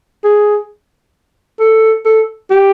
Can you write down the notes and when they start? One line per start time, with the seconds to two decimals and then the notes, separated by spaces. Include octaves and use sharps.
0.24 G#4
1.60 A4
2.05 A4
2.51 G4